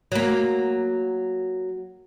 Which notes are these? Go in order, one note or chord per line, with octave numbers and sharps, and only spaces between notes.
F#3 A#3